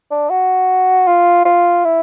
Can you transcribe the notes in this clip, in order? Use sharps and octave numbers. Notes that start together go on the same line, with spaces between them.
D4
F#4
F4
F4
E4